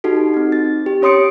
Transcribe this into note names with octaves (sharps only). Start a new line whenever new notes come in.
D#4 F#4 G4 A4
C4 D#4
A6
G4
C#4 C#5 C6 D#6 C#7 D7